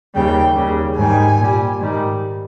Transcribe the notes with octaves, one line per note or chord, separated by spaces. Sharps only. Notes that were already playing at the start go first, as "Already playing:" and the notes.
D#2 C#3 G3 G5
D#2 C#3 G3
G#2 D#3 G3 G#5
A#2 G3
G#2 D#3 G3